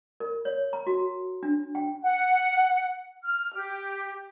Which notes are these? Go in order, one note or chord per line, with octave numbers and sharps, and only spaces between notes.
A#4
C#5
A#5
F#4
D4
G5
F#5
F6
G4